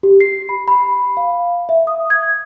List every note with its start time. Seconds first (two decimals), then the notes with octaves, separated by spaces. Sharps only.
0.03 G4
0.20 C7
0.49 B5
0.68 B5
1.17 F5
1.69 E5
1.87 D#6
2.10 G#6